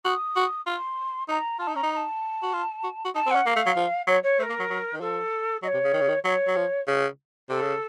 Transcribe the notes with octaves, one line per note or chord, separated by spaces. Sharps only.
F#4 D#6
F#4
F4 C6
D#4 A#5
F4 A5
D#4
C#4 A#5
D#4
A#5
A5
F#4
F4
F#4
F#4
D#4 A5
C4 F#5
C#4
A#3 F5
A3
F#3
F3
F#3 C#5
C#5
A3 C5
A#4
A#3
F#3
F#3
D#3
F3 A4
F#3 D#5
C#5
C3
C#3
D#3
C#3
D#3
F#3 C#5
F#3
F3
C#3
C3 A4
C#3